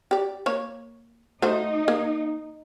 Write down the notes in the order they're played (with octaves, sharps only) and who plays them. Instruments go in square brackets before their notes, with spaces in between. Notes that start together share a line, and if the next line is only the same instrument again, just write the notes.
[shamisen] G4 D5
A#3 C#5
[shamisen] A3 F#4 C5 [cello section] D#4
[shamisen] A#3